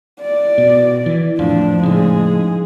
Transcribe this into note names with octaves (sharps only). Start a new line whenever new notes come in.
D5
B2
E3
F2 A2 F3 D4
A2 C#3 G#3 D#4 G#4